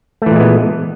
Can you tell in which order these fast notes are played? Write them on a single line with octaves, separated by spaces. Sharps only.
A3 E3 A#2 G#3 B3